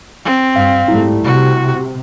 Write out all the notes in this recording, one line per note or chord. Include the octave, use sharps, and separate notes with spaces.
C4
G2 F5
G#2 G3 A3 E4
C3 F#4